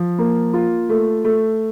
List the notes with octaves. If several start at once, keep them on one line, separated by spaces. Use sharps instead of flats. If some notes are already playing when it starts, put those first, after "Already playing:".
Already playing: F3
A#3
F4
A3
A3